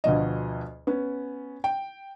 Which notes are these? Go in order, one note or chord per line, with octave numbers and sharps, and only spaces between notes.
D2 B2 F3 D#5
B3 C#4
G5